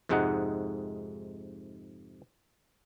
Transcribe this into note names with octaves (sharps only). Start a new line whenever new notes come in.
F2 G#2 C3 G#3 D#4 F#5